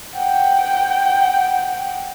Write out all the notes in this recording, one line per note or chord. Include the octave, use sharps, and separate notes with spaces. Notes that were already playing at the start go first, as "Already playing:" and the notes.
F#5 G5